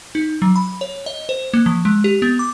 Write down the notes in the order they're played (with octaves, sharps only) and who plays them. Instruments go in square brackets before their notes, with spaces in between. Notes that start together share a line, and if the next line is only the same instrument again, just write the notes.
[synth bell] D#4
F#3
B5
C#5
D#5
C5
A#3
F3
G#3
G4
B3
D6